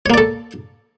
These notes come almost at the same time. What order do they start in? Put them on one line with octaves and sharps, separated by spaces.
C#5 A#3 D5 A4